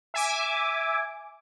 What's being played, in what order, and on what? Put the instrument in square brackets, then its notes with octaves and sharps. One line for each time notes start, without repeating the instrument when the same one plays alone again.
[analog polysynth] E5 G#5 D6